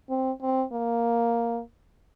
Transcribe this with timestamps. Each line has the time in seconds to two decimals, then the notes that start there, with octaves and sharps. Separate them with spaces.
0.10 C4
0.42 C4
0.72 A#3